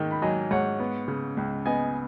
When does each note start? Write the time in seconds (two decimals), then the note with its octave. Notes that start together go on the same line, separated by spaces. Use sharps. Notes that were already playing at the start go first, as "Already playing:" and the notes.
Already playing: G#2 D#3
0.11 B5
0.22 F#3 D#5 G#5
0.51 G#2 C#5 F#5
0.79 B3
1.08 C#3
1.37 C#2
1.66 B3 D#5 G#5